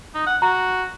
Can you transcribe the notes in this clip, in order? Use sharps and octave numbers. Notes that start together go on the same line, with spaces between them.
D#4
F#5
F#4 A#5